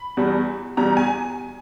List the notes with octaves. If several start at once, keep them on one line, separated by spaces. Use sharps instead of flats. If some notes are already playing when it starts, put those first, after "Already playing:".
Already playing: B5
E2 B2 G3
E2 B2 G3 A#5
G#5